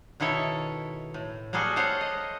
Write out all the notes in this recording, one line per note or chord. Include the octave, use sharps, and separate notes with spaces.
B2 D#3 E4 A4 C#5
A2
G3 A#3 F#4 G#4 A4
A4 C5 C#5 F5 F#5
D#5